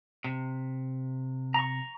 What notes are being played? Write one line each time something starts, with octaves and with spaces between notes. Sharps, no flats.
C3
A#5 C#6